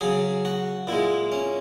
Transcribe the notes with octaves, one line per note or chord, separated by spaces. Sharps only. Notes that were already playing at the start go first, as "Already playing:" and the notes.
C#3 F#3 G#4
F#4
A#2 G#3 E4
C#4